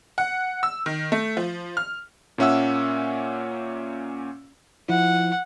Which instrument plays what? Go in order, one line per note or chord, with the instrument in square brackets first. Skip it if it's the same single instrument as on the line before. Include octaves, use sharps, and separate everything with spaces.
[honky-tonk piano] F#5
E6
D#3
A3
F3
F6
[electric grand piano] A#2 A#3 C#4 E5 F#5 E6
[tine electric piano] F3 E4 [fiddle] F#5